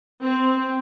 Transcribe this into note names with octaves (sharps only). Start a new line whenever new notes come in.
C4